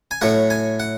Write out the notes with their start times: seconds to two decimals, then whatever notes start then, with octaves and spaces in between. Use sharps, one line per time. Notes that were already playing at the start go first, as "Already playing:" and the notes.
0.11 G#5
0.21 A2 F#3 A3 F#5
0.50 G#5
0.80 F#5